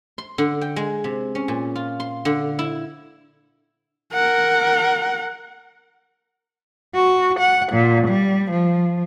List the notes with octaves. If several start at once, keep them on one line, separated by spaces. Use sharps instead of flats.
C6
D3
G5
G#3
C3
C#4
A#2
F4
C6
D3
E4
A#4 F#5
F#4
F#5
A#2
G3
F3